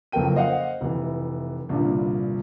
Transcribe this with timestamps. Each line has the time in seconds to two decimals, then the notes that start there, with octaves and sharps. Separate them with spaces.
0.12 F#1 F2 A4 A#4 G5 D#7
0.35 C5 D#5 F5 F#5
0.81 F1 E3
1.69 C2 G2 A#2 D3